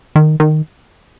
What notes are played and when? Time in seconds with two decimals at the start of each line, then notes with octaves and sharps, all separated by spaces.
0.16 D#3
0.40 D#3